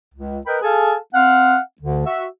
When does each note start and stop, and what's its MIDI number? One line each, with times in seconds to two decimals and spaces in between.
0.15 0.40 37
0.47 0.58 70
0.47 0.58 71
0.47 0.58 75
0.47 0.58 79
0.47 0.58 83
0.62 0.96 68
0.62 0.96 69
0.62 0.96 77
0.62 0.96 80
0.62 0.96 81
1.14 1.58 60
1.14 1.58 77
1.14 1.58 78
1.82 2.03 38
1.82 2.03 50
2.06 2.25 66
2.06 2.25 76